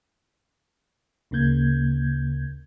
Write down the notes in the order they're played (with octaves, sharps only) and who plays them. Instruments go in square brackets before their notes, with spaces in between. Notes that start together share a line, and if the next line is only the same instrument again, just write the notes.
[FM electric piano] D2 C#3 A#3 G6 G#6